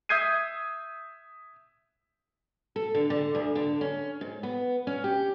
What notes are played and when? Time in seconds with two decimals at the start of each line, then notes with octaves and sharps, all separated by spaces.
0.09 E5 D#6 G6 G#6 C7 D#7
2.76 A4
2.94 D3
3.10 D3
3.35 D2
3.55 D3
3.81 C#4
4.21 G#2
4.43 B3
4.87 C#4
5.04 G4